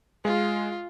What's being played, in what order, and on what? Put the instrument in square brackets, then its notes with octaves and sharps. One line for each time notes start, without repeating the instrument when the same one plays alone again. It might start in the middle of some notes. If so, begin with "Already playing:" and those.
[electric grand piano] G#3 [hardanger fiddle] F4